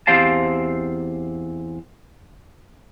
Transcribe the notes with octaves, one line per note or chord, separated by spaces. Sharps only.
E2 C4 G4 C5 F5 A5